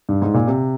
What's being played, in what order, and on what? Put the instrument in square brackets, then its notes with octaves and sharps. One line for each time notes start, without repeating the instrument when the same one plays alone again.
[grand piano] G2
G#2
A#2
C3